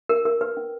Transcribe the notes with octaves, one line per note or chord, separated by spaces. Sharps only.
A#4
A#4
B4
C#4